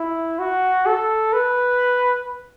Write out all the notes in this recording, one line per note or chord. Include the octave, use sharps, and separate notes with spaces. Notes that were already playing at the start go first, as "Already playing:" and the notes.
Already playing: E4
F#4
A4
B4